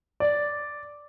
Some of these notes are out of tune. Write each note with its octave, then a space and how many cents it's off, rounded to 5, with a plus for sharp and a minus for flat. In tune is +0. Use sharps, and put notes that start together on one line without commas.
D5 -5